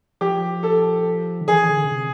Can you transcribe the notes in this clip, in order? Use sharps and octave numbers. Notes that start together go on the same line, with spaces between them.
F3 G4
A4
D#3
E3 G#4
D3
C#3
C3